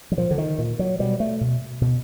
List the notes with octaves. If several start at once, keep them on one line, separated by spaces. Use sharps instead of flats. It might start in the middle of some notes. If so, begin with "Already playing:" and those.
F#3
A#2 F3
D3
D#3
A#2
F#3
B2 G3
A3
B2
B2